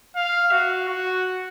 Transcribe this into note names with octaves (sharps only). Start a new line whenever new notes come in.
F5
F#4
F#4